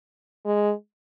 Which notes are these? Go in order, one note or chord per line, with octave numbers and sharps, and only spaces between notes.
G#3